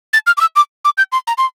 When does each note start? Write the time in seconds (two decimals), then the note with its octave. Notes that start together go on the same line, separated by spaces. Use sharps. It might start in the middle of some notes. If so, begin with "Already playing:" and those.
0.13 A6
0.27 F6
0.37 D6
0.41 E6
0.56 D6
0.85 D6
0.98 G6
1.12 C6
1.27 A#5
1.38 C6